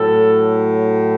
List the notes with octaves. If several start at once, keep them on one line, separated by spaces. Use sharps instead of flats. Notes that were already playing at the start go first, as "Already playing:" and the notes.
Already playing: A2 F#3 A4